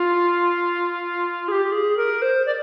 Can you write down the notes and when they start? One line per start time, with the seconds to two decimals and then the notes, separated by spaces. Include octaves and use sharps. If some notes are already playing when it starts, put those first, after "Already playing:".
Already playing: F4
1.48 G#4
1.52 G4
1.72 G#4
1.97 A#4
2.22 C5
2.46 D5